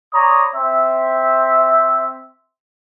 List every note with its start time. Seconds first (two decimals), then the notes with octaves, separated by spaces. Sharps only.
0.14 C#5 D5 A#5 B5 D#6
0.55 C4 E5